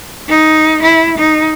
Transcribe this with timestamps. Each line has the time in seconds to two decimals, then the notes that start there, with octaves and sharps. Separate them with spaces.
0.29 D#4
0.82 E4
1.18 D#4